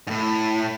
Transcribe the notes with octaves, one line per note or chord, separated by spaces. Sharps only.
G#2
A2